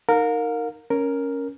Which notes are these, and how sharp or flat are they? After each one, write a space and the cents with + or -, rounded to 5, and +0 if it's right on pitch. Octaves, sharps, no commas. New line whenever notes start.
D#4 +0 A#4 -15 F5 +40
C#4 +0 A#4 +0